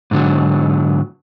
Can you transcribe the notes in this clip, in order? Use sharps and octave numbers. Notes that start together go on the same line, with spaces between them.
G#2 D3 F#3